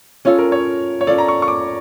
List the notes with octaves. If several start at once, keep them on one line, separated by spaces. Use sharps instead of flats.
C#4 F4 A4 C#5
A#4
C#5
C#5
C#4 F4 A4 D5
A#5
C#6
C#6
D6